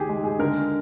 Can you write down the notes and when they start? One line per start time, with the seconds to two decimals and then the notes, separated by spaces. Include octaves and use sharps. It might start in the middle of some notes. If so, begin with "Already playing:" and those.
Already playing: D#2 G4 G#4
0.09 G#3
0.24 G#4
0.39 D3 A#4